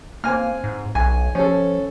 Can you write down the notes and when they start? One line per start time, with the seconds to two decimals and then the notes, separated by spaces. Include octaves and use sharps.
0.24 A#3 C4 G#5 F6
0.64 G#2
0.95 B1 G#5
1.35 F3 C#4 A4